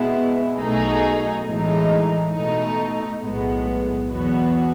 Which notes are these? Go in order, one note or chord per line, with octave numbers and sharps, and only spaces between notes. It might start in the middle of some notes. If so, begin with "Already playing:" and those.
Already playing: B2 G#3 B3 E4
B1 B2 A3 D#4 G#4
A2 E3 G#3 D#4
B2 A3 D#4
B1 A2 G#3 B3
E2 B2 F#3 B3 F#4